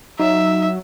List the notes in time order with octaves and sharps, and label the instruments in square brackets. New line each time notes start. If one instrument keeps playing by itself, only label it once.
[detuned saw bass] F#3 [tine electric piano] D#4 [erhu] E5